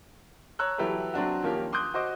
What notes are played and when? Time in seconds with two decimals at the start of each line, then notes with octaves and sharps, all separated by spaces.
0.59 C#5 A#5 E6 F#6
0.78 E3 F#3 E4 G4 A4 B4
1.14 F#3 C4 D4 F#4
1.43 D#3 F3 A#3 C#4 G4
1.73 C6 D6 D#6 F#6 G6
1.94 F#4 C5 D#5 D6